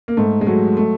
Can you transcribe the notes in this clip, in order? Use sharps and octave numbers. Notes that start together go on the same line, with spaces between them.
A#3
G#2 A3
G#3
F#3 A3
A3